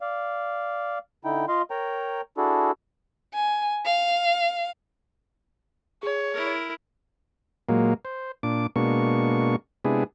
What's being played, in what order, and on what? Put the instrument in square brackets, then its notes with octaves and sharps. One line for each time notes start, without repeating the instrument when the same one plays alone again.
[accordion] D5 F5
D3 D#4 E4 G5
F4 D#5 F5 C6
A#4 C#5 G5 A#5
D4 E4 F#4 G#4 A4
[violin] G#5
F5
[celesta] G#4 [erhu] C#5
[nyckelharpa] E4 A#4
[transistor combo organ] A#2 F#3 G#3 A#3
C5
A#2 D4 D6
B2 G#3 A#3 D4 C#6
C3 G#3 B3 D4 E4 G#4